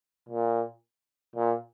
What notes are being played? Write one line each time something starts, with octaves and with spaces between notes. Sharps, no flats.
A#2
A#2